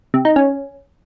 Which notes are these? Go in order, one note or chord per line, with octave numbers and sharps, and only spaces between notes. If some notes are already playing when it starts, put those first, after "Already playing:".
C3
D#4
C#4